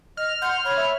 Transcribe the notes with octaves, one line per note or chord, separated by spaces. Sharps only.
D#5 F6
F#5 C6 G6
C#5 B5
E5